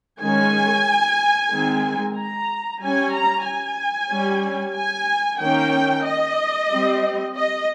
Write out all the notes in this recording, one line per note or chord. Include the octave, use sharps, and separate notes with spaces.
D#3 G#3 C#4 G#5
D#3 G#3 C4
A#5
G3 C#4 G#5
A#5
G#5
G3 C#4
G#5
D#3 A#3 C#4 G5
D#5
G3 C4
D#5